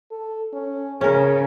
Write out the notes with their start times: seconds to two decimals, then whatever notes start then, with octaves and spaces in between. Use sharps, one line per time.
0.11 A4
0.53 C#4
1.01 C#3 C#4 G#4 A#4